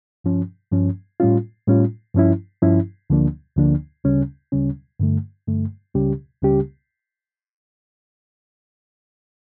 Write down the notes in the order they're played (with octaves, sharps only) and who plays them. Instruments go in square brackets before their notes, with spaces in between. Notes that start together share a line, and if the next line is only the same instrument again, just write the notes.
[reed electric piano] G2 F3 C#4
G2 F3 C#4
A2 G3 C#4 F4
A2 G3 C#4 F4
G2 F3 C#4 E4
G2 F3 C#4 E4
D2 D3 F3 A#3 D4
D2 D3 F3 A#3 D4
D2 C#3 G3 C#4
D2 C#3 G3 C#4
G2 D3 A3
G2 D3 A3
C#2 C#3 G3 C#4 G4
C#2 C#3 G3 C#4 G4